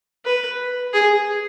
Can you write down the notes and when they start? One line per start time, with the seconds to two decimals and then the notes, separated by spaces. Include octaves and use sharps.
0.26 B4
0.93 G#4